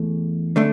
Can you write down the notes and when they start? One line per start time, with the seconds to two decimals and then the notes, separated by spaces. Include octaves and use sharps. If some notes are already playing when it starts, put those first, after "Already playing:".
Already playing: E2 E3 A3
0.56 D3 A3 D4